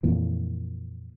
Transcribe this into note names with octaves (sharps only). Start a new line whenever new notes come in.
F2 A#2 E3